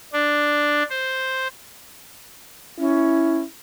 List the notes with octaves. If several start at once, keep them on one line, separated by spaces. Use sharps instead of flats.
D4
C5
C#4 E4